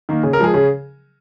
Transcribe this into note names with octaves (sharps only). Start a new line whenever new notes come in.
D#3 A#3
C#3 G#4
A#4
F3 G#3 G#4
C#3 G#4